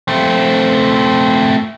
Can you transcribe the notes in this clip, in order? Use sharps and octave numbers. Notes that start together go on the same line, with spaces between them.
A3 C4